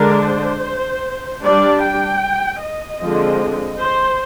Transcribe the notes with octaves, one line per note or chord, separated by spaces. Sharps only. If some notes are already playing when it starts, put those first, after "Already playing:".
Already playing: D3 G#3 D4 A#4
C5
G3 D4 D5
G5
D#5
D3 F3 G#3 C4
C5